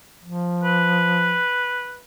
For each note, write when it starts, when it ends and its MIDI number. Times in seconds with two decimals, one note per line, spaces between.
0.25 1.41 53
0.63 1.99 71